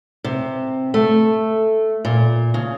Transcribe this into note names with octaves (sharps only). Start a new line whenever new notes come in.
C3
A3
A#2
C#3